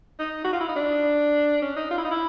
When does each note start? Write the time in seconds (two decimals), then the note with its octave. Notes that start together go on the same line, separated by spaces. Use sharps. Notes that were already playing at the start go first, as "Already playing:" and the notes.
0.19 D#4
0.45 F#4
0.53 F4
0.61 E4
0.69 D#4
0.76 D4
1.62 C#4
1.76 D#4
1.91 F4
1.98 E4
2.04 D#4
2.11 E4